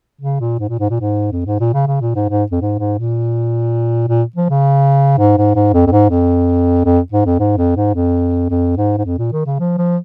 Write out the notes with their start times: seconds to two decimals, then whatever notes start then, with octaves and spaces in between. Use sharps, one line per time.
0.21 C#3
0.40 A#2
0.59 G#2
0.69 A#2
0.79 G#2
0.90 A#2
1.00 G#2
1.32 F2
1.46 G#2
1.60 A#2
1.73 C#3
1.87 C#3
2.01 A#2
2.15 G#2
2.29 G#2
2.51 F2
2.61 G#2
2.79 G#2
2.98 A#2
4.08 A#2
4.36 F3
4.50 C#3
5.18 G#2
5.37 G#2
5.55 G#2
5.73 F2
5.86 F2
5.91 G#2
6.10 F2
6.85 F2
7.12 G#2
7.26 F2
7.39 G#2
7.57 F2
7.76 G#2
7.94 F2
8.50 F2
8.77 G#2
8.98 G#2
9.05 F2
9.18 A#2
9.32 D#3
9.46 C#3
9.59 F3
9.78 F3